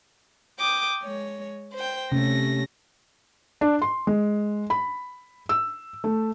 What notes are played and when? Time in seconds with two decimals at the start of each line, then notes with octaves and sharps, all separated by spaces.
0.59 G5 D6 D#6
1.02 G#3 C#5
1.73 C5 G5
2.12 C3 A3 C#4 A#6
3.61 D4
3.82 C6
4.07 G#3
4.70 B5
5.49 E6
6.04 A3